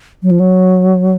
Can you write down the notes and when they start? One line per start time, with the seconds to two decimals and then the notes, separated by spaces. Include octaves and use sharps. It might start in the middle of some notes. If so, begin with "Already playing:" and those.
0.23 F#3
0.31 F3
0.40 F#3